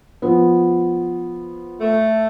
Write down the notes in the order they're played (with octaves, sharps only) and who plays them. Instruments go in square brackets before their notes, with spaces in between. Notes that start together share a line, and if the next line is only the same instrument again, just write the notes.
[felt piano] F3 B3
[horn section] A3